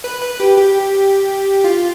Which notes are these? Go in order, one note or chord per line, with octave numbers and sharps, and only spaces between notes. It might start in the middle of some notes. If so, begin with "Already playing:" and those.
B4
B4
G4
G4
F4